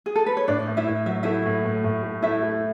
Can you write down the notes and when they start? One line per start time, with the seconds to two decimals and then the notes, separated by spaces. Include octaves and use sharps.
0.06 G#4
0.16 A4
0.26 B4
0.37 C#5
0.48 A2 D4 D5
0.67 A2
0.77 E4 E5
0.87 A2
1.06 F#3 E5
1.23 A3 E4 E5
1.46 A2
1.65 A2
1.84 A2
2.03 A3
2.22 A3 E4 E5
2.43 A3